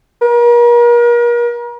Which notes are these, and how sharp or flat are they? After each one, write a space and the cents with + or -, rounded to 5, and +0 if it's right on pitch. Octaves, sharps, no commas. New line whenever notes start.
A#4 +40